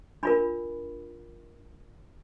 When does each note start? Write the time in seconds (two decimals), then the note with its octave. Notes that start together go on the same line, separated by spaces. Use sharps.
0.23 D4 F4 A#4 B5